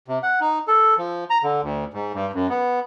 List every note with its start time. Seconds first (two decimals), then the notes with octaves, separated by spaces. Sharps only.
0.08 C3
0.23 F#5
0.41 D#4
0.68 A4
0.98 F3
1.30 A#5
1.43 D3
1.63 D2
1.94 G#2
2.14 G2
2.34 F#2
2.50 B3